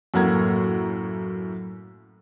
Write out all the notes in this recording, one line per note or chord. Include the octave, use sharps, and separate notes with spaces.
F#2 A2 A#3 F#5 A#5 G#6